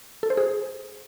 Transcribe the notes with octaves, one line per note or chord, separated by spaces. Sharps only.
A4
C5
G#4